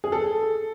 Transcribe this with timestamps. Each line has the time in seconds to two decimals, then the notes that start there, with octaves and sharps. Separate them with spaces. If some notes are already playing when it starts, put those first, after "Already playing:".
0.04 G#4
0.12 A4